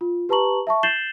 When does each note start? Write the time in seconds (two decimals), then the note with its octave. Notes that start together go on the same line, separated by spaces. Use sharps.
0.01 F4
0.29 G4 B4 A5 A#5 C#6 F#7
0.67 E5 A5 C#6
0.83 G6 A6 C7 E7 F#7 G7